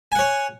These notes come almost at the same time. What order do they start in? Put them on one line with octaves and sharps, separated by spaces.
G#5 F#5 C#5